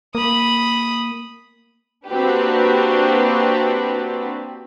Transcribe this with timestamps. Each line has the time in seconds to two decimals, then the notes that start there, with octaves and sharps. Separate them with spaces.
0.15 A#3 B5 D#6
2.08 A#3 C4 D4 F#4 G4 B4